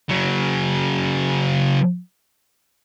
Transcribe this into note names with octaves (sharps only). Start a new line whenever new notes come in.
C#3 F#3